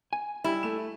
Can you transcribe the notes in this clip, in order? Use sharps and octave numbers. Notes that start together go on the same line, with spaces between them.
G#5
G3 E4
A3 E7